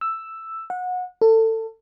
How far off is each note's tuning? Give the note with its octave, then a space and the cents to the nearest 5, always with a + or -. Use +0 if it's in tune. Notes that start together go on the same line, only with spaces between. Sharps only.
E6 +5
F#5 -25
A4 +25